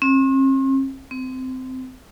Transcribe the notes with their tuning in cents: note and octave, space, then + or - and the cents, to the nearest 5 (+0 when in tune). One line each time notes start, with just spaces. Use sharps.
C4 +45
C4 -20